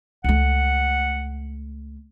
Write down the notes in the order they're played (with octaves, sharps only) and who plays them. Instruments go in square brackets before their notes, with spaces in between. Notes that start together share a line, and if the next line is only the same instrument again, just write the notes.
[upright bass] C#2 A3 [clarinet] F#5